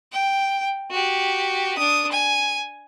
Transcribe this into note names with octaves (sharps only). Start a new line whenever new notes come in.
G5
F#4 G4
D4 D#6
G#5